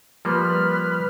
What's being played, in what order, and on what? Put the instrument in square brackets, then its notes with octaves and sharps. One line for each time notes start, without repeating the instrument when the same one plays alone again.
[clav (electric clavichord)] F3 G3 A#3 [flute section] B4 F6